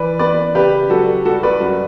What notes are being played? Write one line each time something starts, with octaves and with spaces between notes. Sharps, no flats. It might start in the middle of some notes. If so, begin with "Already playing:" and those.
Already playing: E3 B4 D5
B3 B4 D5
C#3 G4 B4
F#3 F#4 A4
G3 F#4 A4
B4 D5
F#2 F#4